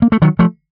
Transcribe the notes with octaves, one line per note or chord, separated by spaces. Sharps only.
A#3
A3
D#3 F#3
F3 A3